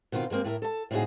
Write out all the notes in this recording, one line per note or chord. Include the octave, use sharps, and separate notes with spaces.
B2 D#3 C4 F4
G2 G#3 A#3 C4
A2 E4 G#4 A#4
A4 A5
A2 C#3 C4 D#4 F#4 G#4